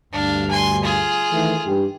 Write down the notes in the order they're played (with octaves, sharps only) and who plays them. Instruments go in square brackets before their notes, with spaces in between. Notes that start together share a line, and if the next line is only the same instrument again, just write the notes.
[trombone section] D2 G2 [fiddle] D4 F5
[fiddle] G#5 C6
F4 G#4
[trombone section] D#3 E3 A3
G2 G4